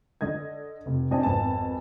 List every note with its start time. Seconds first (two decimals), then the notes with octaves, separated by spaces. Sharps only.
0.21 D3 D#5 G#6
0.86 F1
1.11 C4 D4 D#5 G#5 A5
1.23 G#1 F2 B3 G#5 A5